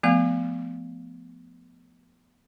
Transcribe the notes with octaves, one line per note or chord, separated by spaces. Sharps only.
F3 A3 B3 F5